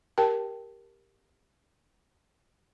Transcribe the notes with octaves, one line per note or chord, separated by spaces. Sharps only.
G4 A#4 G5 A5